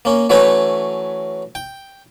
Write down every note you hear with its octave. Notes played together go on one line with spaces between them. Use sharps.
A#3 C#4
E3 F#3 A3 C#4 B4 C#5
G5